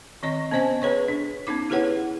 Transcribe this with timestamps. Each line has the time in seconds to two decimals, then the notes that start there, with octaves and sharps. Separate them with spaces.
0.23 D#3 C4 D#5 C#6
0.51 B3 C#4 C5 D#5 G#5 A5
0.82 G#4 B4 C#5 C#6
1.08 D4
1.47 B3 C#4 D#4 D6
1.70 E4 G4 G#4 B4 C#5 F#5